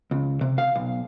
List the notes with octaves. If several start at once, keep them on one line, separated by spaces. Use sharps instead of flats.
C#2
C3
F5
B1